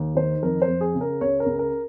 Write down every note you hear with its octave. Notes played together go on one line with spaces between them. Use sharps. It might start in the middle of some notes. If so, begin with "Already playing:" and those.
Already playing: D#2
D#3 C5
F2 A#4
C5
F2
G#4
C#3
A#4
C#2 C#5
A#4
C#2
A#4